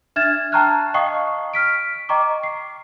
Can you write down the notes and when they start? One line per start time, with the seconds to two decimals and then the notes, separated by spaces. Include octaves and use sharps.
0.16 D4 E5 F6 G#6 A6 E7
0.52 G5 A5 A#5 C#6 F6 F#6
0.94 D#5 F5 G5 C#6 D#6 C7
1.54 F6 B6 D7
2.09 D#5 G5 A#5 C#6 D6
2.43 C7